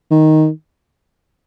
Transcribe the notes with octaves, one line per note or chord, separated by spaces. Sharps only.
D#3